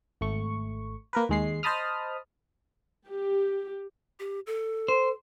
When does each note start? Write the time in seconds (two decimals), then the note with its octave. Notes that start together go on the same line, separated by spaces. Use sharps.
0.21 G#1 A3 C#6
1.13 A#3 A#4 B4
1.29 D#2 G#3 C7
1.63 C5 D#5 A5 B5 D#6 F6
3.07 G4
4.20 G4
4.47 A4
4.88 C5